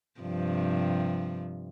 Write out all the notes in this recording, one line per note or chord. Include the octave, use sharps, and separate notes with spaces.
G2 C3 F3